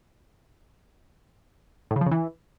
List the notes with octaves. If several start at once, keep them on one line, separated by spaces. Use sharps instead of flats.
A2
C#3
F3
C#3
E3